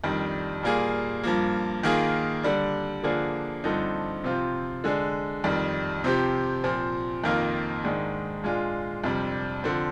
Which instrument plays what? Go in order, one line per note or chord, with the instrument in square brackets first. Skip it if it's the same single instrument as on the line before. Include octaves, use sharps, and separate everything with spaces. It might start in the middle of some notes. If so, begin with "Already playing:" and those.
[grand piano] F2 D#3 G3 D4
A#2 G3 A#3 F4 G#4
G2 F3 A#3
D#3 A#3 F4 G#4
D3 G3 D4
D3 F3 A#3 D4 G#4
G2 D3 F3 C4 D#4
C3 F3 C4 F4
D3 G#3 D4
F2 D#3 G3
C3 F3 C4 G4
A#2 F3 C4
F2 D#3 A#3 F4
G#2 D#3 G#3 D4
A#2 G#3 D4 F4
F2 C3 G3 D4
D3 F3 C4